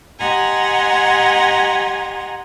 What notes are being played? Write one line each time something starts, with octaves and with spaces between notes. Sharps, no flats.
G4 D#5 F#5 G#5 A#5 C6